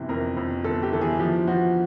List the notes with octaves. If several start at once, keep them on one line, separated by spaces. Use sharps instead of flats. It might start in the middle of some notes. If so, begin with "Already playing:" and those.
Already playing: G1 C3 E3
F2 A#4
F2
G1 A4
G4
E3 A4
G#4
F3 G4
F3 F#4